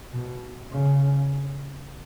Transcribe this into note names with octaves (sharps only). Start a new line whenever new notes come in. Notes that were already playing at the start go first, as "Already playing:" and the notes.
B2
C#3